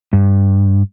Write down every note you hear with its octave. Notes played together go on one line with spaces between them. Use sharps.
G2